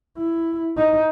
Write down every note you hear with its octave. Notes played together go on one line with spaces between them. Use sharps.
E4
D#4